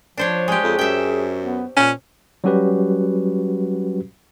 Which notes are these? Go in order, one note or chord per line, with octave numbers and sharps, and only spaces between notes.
F3 D4 C5 C#5
G#3 G4
F2 G#4
F#2 E5 G5
B3
A#2 C#4
F#3 G3 C#4 F#4 G4 B4